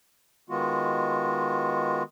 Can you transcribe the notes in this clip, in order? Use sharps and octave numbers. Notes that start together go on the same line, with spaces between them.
D#3 G#3 B3 F4 F#4